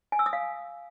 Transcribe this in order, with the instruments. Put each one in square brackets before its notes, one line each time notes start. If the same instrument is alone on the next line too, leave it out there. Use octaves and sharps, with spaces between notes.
[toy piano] G#5
E6
D#6
F5